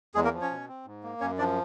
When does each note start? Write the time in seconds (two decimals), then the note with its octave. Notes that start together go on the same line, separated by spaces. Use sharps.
0.15 E2 G#3 G#4
0.24 A#3 A#4
0.33 F3
0.41 C#4 C#5
0.51 B2
0.68 C4
0.86 G#2
1.03 A#3
1.21 F#2 C#4 C#5
1.38 F3 D4 D5